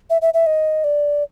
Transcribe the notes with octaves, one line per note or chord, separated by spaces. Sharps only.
E5
E5
E5
D#5
D5